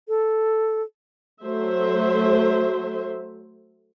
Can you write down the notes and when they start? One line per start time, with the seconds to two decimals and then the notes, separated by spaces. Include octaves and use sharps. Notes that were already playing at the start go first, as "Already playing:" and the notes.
0.08 A4
1.44 F#3 A3 C5 E5